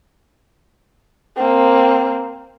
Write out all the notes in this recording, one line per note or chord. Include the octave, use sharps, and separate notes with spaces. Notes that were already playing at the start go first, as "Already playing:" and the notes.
A#3 C4